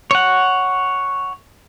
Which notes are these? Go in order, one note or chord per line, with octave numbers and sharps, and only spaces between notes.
C#5 F#5